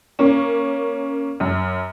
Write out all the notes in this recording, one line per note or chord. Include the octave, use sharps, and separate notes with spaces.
A#3 C#4
F#2